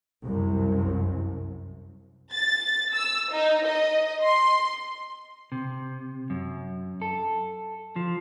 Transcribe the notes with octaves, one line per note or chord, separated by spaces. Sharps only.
C2 F#2
A6
E6
D#4
D#5
C6
C3
F#2
A4
F3